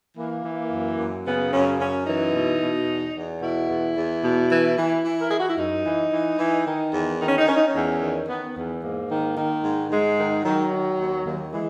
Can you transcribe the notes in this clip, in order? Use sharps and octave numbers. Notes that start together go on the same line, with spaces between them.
E3 A#3
E3
F#2
F#2
C#3 B3
F#2 C#4
F#2 C#4
E3 D#4
B2
B2
E2
E2
B2 E4
E2
E2
B2
E3
E3
E3
A#4
E3 G#4
F#4
E4
F#2 D#4
E3
E3
E3
D#3
E2
D#3 D#4
C#4
D#4
D#3 C#4
D#4
C#4
E2
D#3
D#3 B3
E2 B3
G#2 A#3
D#3
D#3
G#2
G#2 G#3
D#3
D#3 F#3
D#3
D#2
D#2
E3 G#3